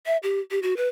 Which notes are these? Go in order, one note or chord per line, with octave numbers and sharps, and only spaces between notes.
E5
G4
G4
F#4
B4